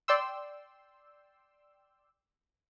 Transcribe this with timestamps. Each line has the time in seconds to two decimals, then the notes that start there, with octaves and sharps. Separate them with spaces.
0.08 D5 G5 C6 E6